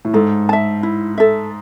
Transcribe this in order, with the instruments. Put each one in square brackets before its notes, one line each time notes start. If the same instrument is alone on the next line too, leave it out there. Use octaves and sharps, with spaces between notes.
[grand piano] A2
[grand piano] G#2 [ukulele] A4
[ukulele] E5 A5
E4
A4 E5